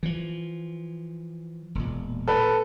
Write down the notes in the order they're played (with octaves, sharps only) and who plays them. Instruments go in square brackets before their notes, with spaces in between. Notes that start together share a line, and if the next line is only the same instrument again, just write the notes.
[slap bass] E3 F3
E1 A#2
[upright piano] A4 B4